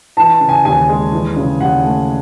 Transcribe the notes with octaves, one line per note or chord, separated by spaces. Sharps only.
E3 A5
C#3
G#5
D#2 G#5
G#3
E3
C#3
D#2 F#5
A3